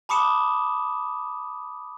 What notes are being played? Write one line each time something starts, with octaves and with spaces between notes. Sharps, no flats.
A5 B5 D6 D#6 C#7 E7